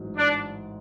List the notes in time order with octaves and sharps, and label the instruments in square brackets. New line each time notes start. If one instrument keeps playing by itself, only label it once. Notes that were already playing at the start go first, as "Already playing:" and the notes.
Already playing: [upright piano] A1 G#2 F#3
[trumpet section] D4